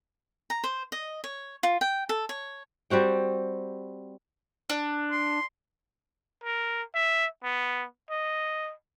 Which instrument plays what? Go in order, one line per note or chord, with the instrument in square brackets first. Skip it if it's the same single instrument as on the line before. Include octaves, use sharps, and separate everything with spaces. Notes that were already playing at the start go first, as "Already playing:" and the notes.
[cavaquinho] A#5
C5
D#5
C#5
F4
G5
A4
C#5
[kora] G3 C4 F#4 G5
[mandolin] D4
[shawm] C6
[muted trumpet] A#4
E5
B3
D#5